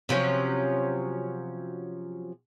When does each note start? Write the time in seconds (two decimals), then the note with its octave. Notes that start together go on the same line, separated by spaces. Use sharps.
0.09 C3 F3 F#3 C#4